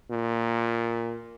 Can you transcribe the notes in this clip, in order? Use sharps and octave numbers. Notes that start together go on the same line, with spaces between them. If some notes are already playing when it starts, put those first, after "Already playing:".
A#2